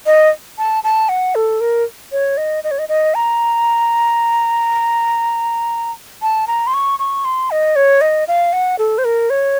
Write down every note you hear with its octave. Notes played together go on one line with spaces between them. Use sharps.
D#5
A5
A5
F#5
A4
A#4
C#5
D#5
D#5
C#5
D#5
D#5
A#5
A5
A#5
C6
C#6
C#6
C6
D#5
C#5
D#5
F5
F#5
A4
C5
A#4
C#5